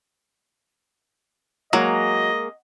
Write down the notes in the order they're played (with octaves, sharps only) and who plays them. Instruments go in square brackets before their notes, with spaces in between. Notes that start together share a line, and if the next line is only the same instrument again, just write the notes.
[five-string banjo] F#3 [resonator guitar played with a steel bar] G#3 A#3 [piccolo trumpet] D#5